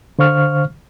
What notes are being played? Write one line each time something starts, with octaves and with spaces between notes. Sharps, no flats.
D3 C5 F5 C#6 F6